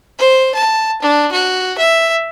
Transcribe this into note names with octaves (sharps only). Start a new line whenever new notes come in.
C5
A5
D4
F#4
E5